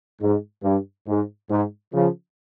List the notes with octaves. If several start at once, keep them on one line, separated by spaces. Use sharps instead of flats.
G#2
G2
G#2
G#2
C#3 F3